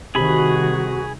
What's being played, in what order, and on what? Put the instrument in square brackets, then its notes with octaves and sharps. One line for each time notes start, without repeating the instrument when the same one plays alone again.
[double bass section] C2 D#3 [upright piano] C3 [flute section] F#4 [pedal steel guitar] G#4 B5